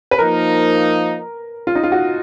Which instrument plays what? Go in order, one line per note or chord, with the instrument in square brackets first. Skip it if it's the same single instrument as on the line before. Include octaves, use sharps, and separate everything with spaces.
[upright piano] B4
[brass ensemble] F3 A#3 D#4 [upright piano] A#4
[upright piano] F4
D#4
F4
F#4